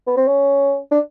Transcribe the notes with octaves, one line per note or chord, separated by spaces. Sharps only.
B3
C4
C#4
D4